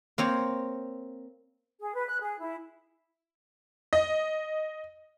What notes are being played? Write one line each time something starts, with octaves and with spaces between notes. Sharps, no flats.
A#3 C4 C#5
G#4
B4
F#6
G#4
E4
D#5